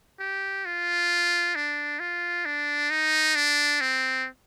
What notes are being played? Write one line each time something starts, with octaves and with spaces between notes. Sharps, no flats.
G4
F4
D4
F4
D4
D#4
D4
C4